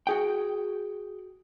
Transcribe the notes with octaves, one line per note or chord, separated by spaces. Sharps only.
F#4 G#4 G5